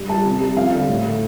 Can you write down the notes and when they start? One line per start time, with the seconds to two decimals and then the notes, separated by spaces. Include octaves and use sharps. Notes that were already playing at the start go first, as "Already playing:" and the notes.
Already playing: G2
0.09 G3 A5
0.25 C3
0.41 G3
0.57 F2 F5
0.73 D3 G3
0.88 A2
1.05 A3